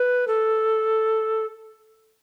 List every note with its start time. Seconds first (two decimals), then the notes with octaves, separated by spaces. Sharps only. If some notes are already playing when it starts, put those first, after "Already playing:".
Already playing: B4
0.28 A4